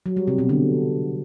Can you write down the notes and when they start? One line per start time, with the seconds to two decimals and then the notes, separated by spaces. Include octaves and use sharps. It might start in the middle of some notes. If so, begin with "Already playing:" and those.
0.06 F#3
0.17 G3
0.27 C3
0.38 B2
0.49 D3